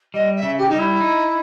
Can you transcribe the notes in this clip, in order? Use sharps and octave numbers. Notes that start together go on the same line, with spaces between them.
G3 D#5
E5
C#3
G4
G3 D#4
E4
D#4